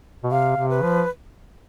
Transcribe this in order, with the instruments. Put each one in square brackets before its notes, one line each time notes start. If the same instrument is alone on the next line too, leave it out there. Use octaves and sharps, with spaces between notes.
[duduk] B2
[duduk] C3 [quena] F5
[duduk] C3
[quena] B4
[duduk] F3